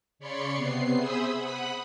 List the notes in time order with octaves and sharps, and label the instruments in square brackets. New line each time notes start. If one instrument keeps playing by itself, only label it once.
[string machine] C#3 C#5 D5 B5 C6 C#7
C3 B3 C7
G#4 C5 E5 B5 D#6 E6
F#5 B5 D#6 F#6